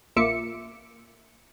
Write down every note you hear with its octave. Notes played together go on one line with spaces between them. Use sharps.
A#1 A#3 F4 E5 D6 C#7